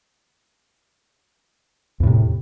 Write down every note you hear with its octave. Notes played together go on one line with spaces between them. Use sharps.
E2 A2 C3